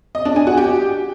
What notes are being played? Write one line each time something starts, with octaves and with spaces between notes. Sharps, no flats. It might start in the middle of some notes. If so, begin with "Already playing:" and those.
D#5
D4
G#5
F#4
G4